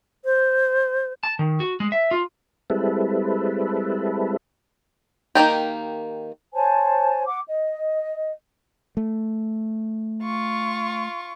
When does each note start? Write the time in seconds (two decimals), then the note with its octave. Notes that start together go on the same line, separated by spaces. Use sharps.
0.24 C5
1.23 A5
1.39 D#3
1.60 F#4
1.80 G#3
1.92 E5
2.11 F4
2.70 G3 G#3 C4 E4 A4 B4
5.35 D#3 A#3 D#4 G4
6.54 C5 C#5 G#5 A5
7.27 F#5 D6
7.49 D#5
8.97 A3
10.24 F4 C#6